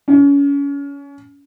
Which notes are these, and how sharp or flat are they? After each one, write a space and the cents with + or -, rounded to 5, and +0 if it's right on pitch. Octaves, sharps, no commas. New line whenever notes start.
C#4 +30